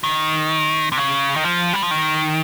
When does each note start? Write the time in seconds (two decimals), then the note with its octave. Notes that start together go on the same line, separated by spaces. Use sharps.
0.04 D#3
0.92 C3
0.97 C#3
1.36 D#3
1.44 F3
1.73 G3
1.82 F3
1.91 D#3